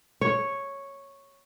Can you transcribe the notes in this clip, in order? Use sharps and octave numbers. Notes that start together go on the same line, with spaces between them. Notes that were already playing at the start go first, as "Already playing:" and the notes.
C#5